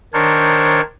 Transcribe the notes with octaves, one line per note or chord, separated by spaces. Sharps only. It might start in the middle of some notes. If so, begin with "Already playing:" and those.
D#3 D4 A#4 C5 C#5